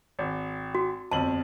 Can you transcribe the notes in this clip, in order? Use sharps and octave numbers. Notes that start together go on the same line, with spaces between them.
G#1
F#4
G1 F2 A5 F#7